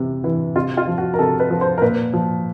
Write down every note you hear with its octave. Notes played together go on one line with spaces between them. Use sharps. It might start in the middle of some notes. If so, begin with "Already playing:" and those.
Already playing: C3 E3
E3
C3 F4
F4
F3
F#4
A#4
C3 A4
B4
F3
C5
A#4
A#2 B4
F3